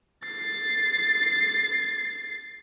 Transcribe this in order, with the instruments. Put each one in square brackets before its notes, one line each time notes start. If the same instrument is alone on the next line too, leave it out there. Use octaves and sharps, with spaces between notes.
[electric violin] A6 C7